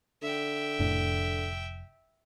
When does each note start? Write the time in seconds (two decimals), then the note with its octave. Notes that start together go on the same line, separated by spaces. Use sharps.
0.23 D3 E5 G5
0.80 F1 A2 D4